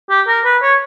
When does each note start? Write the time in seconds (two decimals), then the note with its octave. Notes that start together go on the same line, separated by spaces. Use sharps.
0.10 G4
0.27 A#4
0.45 B4
0.62 C#5